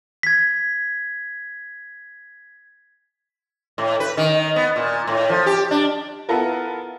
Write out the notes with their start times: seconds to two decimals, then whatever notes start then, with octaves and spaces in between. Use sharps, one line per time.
0.23 G#6 B6
3.78 A2
4.00 B4
4.17 D#3
4.56 B3
4.76 A#2
5.07 A2
5.30 F3
5.46 G4
5.71 D4
6.29 B3 E4 F4 A4 A#4